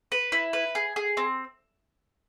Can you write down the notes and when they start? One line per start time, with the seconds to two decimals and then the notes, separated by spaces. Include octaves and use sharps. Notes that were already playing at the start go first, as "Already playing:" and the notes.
0.12 B4
0.32 E4
0.53 B4
0.75 G#4
0.96 G#4
1.17 C4